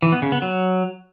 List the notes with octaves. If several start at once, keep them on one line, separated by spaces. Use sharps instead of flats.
E3
B3
C#3
B3
F#3